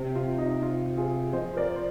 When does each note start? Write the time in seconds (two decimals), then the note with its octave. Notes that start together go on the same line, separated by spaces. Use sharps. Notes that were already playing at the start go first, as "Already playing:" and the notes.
Already playing: C3
0.16 F4
0.38 D#4
0.62 F4
0.97 F4 G#4
1.33 F3 C5 D#5
1.57 A#4 D5
1.76 C5